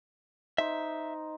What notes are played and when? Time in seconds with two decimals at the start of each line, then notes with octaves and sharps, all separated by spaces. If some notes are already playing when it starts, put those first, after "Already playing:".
0.58 D#4 C5 E5